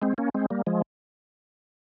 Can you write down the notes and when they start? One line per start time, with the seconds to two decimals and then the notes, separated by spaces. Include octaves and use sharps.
0.02 G#3 C4
0.18 A#3 C#4
0.35 G#3 C4
0.50 G3 A#3
0.67 F3 G#3